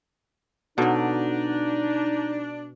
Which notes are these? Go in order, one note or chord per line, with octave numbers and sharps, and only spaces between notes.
B2 D3 F#3 D4 D#4